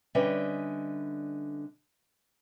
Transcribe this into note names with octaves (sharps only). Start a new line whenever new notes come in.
D3 G3 C#4 B4 D#5 E5